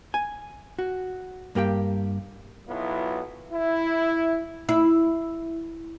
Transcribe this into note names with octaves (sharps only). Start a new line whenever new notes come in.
G#5
F#4
G2 A#3 G4 G5
B1 F#3 B3 E4 F4
E4
E4